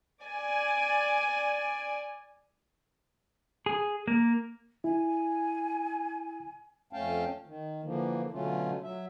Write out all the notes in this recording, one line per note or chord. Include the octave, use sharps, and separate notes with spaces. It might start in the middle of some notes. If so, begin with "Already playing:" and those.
D5 G#5
G#4
A#3
E4 G#5
F2 A3 C#4 F5 G5 A5
D#3
D3 E3 F3 A#3
B2 D3 F#3 A3 C#4 F4
F#3 E5